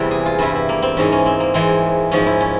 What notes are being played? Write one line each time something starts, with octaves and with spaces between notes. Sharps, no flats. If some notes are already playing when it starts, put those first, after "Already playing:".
Already playing: E2 C3 E3 G3
G#4
F4
G2 G3 E4
E4
A#3
C4
G#2 E3 G#3 C#4
C#4
C4
A#3
E2 E3 G#3 C4
G#2 F3 G#3 C#4
E4
C#4